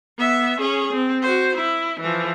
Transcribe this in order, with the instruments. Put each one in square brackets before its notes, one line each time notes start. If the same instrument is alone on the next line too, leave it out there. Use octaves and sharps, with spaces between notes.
[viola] B3 E5
C#4 G#4
C4
F#4 C5
E4
E3 F3